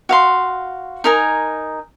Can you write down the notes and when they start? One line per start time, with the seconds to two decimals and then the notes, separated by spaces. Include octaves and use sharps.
0.09 F#4 F5 C6
1.04 D#4 A#4 G#5